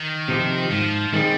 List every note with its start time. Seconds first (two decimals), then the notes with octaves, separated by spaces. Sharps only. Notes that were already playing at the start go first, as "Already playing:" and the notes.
Already playing: D#3
0.28 C3 F3 C4 G4
0.71 G#2 F3
1.13 D#3 G3 G#3 C4